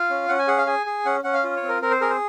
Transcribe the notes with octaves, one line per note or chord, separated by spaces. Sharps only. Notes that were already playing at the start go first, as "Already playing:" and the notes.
Already playing: F4 F5
C#4
C#4 F#5
G#5
G#4 F#5
F5
G#4 G#5
G#4
C#4 F#5
C#4 F#5
F5
F4
C#5
C4
A#4
C4 A#4
C5
G#4 A#4
C5